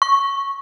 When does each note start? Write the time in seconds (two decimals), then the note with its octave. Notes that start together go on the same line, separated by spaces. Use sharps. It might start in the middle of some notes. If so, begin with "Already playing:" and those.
0.02 C#6